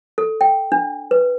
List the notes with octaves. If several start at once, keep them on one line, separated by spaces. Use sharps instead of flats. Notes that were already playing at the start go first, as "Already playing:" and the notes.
A4
G5
D4
B4